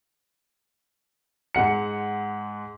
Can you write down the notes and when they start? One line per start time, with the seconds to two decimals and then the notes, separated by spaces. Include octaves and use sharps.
1.55 G#2 G#3 F#5 C#7